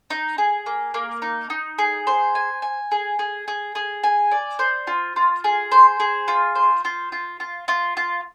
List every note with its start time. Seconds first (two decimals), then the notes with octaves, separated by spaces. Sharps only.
0.10 D#4
0.38 G#4
0.66 A#3
0.94 A#3
1.22 D#4
1.50 D#4
1.79 G#4
2.07 C5
2.35 G#5
2.62 G#5
2.92 G#4
3.19 G#4
3.48 G#4
3.75 G#4
4.04 G#5
4.31 D5
4.59 C5
4.87 F4
5.16 F4
5.44 G#4
5.72 C5
6.00 G#4
6.28 F4
6.55 C5
6.85 F4
7.12 F4
7.40 F4
7.68 F4
7.97 F4